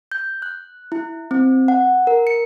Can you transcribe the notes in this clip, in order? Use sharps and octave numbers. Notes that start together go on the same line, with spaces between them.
G6
F#6
E4
C4
F#5
A#4
C#7